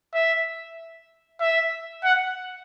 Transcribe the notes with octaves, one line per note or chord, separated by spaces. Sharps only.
E5
E5
F#5